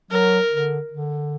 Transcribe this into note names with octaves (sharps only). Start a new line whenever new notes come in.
F#3 A#4
D3
D3